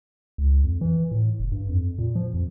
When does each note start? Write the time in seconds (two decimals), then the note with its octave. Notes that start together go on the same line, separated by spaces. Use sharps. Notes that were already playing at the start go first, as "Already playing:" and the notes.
0.38 C#2
0.64 F2
0.81 E3
1.11 A2
1.39 F#1
1.52 G2
1.69 F2
1.98 A#2
2.15 F3
2.34 F2